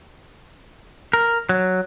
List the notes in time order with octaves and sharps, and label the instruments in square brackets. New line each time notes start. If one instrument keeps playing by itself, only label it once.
[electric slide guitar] A#4
F#3